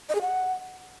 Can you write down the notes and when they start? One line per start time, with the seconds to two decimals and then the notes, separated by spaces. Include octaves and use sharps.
0.09 D#5
0.15 G#4
0.21 F#5